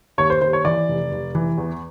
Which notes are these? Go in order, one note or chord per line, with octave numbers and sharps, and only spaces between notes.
D#2 C#5
C5
D#2 C5
C#5
E3 D5
F1
F1
E3
E2